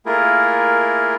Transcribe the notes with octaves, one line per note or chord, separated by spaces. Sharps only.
A3 A#3 E4 F4 G#4 A#4